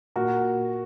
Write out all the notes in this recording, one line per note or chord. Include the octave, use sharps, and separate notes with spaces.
A#2 F#4 A#4